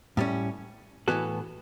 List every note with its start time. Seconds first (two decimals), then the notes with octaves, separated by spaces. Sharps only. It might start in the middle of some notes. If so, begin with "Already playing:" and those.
0.17 A2 G3 C#4
1.08 A2 E3 B3 F#4 A4